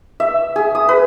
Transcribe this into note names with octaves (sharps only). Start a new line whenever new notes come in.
E5
G#4
D#6
B4